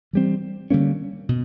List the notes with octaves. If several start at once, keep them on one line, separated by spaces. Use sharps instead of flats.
E3 G3 C4
D3 G3 A#3 C#4
B2